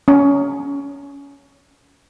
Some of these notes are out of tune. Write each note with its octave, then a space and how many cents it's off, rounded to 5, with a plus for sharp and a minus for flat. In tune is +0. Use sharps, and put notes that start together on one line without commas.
C#4 +20